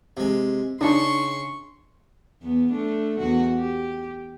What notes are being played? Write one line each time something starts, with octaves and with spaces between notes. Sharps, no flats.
C3 G#3
C#3 D4 D#4 C6 C#6
E2 B3
A3 D4
E2 F#4
G4